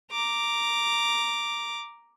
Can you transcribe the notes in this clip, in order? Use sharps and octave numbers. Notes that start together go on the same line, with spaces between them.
A#5 D6